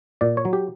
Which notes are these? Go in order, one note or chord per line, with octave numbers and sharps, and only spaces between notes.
A#2 D5
C#5
F#3
G4